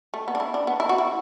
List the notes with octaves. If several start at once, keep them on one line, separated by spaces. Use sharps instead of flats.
A3
B3
D4
E4
D4
B3
E4
F#4
E4